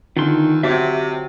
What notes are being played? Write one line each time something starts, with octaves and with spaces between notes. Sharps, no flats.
E2 D3 D#3 D4 F4 C6
C3 F#4 C#5 E5 D6